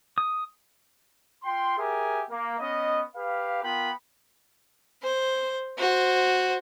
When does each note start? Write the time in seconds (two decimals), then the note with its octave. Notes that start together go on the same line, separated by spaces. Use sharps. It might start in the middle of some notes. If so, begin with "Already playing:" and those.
0.18 D#6
1.43 F4 G5 C6
1.78 G4 G#4 A#4 E5 G#5
2.30 A#3
2.59 B3 C#4 D#5
3.14 G4 B4 F5
3.62 B3 F4 A#4 G5 B5
5.03 C5
5.78 F#4 C5